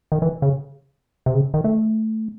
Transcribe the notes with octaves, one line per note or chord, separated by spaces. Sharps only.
D#3
E3
C#3
C3
C#3
D#3
A3